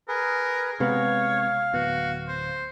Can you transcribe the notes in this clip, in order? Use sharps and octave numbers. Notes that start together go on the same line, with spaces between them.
G#4 A#4 B4
C3 G#3 B3 C#5 F5
D1 B3 F#4
C5